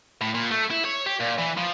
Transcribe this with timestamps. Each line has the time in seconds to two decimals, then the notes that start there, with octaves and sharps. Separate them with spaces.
0.21 A2
0.34 A#2
0.51 A3
0.71 E4
0.85 C#5
1.06 G4
1.20 A#2
1.38 E3
1.57 F3